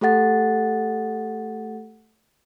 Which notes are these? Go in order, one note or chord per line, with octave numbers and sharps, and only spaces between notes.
A3 G4 A4 F#5 A6